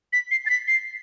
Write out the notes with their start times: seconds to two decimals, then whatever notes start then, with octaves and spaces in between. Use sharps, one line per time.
0.13 B6
0.31 C7
0.46 A6
0.50 B6
0.68 C7